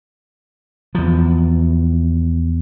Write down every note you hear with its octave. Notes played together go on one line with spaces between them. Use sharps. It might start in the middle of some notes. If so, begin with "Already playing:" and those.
E2 F3